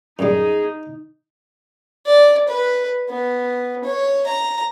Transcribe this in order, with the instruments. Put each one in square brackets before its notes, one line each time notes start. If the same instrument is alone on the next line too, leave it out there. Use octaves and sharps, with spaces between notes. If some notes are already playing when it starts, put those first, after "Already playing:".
[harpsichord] F#2 G3 [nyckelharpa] D#4 [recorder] G#4
[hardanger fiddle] D5
B4
B3
C#5
A#5